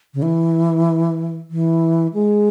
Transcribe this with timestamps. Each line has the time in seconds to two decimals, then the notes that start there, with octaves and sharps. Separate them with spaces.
0.14 C#3
0.22 E3
1.50 E3
2.14 G#3